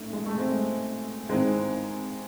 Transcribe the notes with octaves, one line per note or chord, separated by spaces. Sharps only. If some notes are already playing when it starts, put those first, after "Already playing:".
Already playing: A1 G#2 A3
G#3
A3
G#3 C4
G#1 G#2 E3 G#3 C4